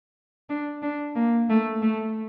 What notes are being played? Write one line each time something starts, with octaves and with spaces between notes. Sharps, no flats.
D4
D4
A#3
A3
A3